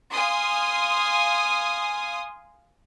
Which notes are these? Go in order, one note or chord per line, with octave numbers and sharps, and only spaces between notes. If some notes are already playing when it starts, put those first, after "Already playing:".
F5 G#5 C6 D#6